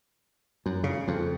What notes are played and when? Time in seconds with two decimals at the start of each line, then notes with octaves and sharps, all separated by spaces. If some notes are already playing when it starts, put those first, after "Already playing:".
0.66 F#2
0.84 C#3
1.08 F2